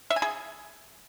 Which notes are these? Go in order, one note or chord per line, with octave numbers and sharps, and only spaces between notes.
E5
G#5
G#4